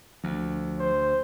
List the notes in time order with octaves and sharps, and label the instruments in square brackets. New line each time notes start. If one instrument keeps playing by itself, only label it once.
[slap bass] D2 [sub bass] F3
[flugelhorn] C5